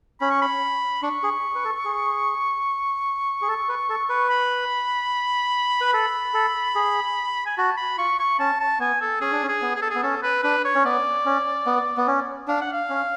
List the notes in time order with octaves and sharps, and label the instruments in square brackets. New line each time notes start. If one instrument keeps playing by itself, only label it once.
[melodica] C#4 [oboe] B5
[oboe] C#6
B5
[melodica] D4 [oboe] C#6
[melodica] G#4
B4
A4
G#4
G#4
A4
B4
A4
B4
[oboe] B5
[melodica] B4
[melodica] A4 [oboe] B5
[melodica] A4
G#4
[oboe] G#5
[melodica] F#4 [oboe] A5
[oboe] B5
[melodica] F4 [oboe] C#6
[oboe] C#6
[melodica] C#4 [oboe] A5
[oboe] A5
[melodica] B3 [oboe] G#5
[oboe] A4
[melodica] C#4 [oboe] G#4
[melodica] D4
C#4
[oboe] G#4
[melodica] B3
[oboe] G#4
A4
G#4
[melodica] B3
[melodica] C#4 [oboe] A4
[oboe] B4
[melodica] D4 [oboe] B4
[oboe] C#5
[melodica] C#4
[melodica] B3 [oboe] D5
[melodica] C#4
B3
B3
C#4
[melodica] D4 [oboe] F5
[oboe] F#5
F5
[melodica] C#4